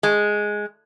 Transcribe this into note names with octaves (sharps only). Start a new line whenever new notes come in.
G#3